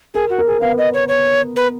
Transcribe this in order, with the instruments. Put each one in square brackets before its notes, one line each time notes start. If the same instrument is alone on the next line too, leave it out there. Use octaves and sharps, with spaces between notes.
[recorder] G#4 [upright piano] A#4
[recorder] F#4
[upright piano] A#4
[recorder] G#4
[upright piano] B3 [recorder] F5
[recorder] D#5
C#5
C#5
B4